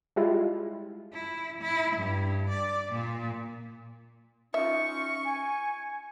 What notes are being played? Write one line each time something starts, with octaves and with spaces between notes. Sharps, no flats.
G3 G#3 E4 F4
E4
E4
G2
D5
A#2
C#4 D#4 F4 E5 C#6
G#5